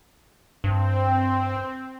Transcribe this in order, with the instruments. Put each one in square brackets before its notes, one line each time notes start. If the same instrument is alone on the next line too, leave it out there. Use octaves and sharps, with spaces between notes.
[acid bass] G2 [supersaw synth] C4